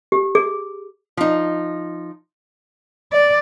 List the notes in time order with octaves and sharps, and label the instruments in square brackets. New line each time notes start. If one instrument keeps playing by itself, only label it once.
[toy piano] G4
G#4
[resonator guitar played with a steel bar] F3 D#4
[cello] D5